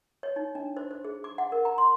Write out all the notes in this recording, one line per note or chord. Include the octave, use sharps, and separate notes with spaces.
C#5
D#4
D4
C5
C5
G#4
D6
F#5
A#4
A#5
C6